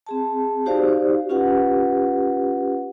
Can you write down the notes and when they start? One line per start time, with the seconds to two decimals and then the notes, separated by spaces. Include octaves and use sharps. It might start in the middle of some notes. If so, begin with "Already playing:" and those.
0.07 C4 G#4 A5
0.66 D#4 F#4 G4 C5 D5 F5
1.29 C#4 F4 G4 B4 F#5